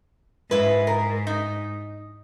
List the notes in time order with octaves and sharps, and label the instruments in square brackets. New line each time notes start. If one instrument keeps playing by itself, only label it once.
[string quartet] G#2 [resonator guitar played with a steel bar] E4 B4
[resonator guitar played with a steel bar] A#4
D#4